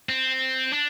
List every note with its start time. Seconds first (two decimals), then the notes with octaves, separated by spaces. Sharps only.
0.09 C4
0.73 D4